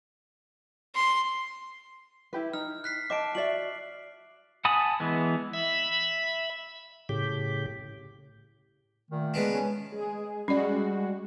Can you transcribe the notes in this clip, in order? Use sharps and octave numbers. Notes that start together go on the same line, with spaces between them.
C6
E4 G4 B4
D#4 F6
F#6 B6 C7
G4 D#5 A5 D6 D7
F#4 D5 E5 C7 F#7
F#5 G#5 A5 B5 D#6
E3 G#3 B3
E5 B5
A2 C#3 G4
A#2 D#3 A3
G#3 B3 D4
C#4
G#3 G#4
G3 G#3 C#4 F#4 D5